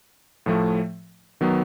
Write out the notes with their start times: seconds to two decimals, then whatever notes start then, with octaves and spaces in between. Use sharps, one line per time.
0.46 A2 F3 A3
1.41 D#3 F#3 B3